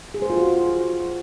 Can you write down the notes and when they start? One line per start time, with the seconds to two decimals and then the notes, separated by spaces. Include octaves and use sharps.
0.14 G#4
0.22 C5
0.30 F4
0.38 F#4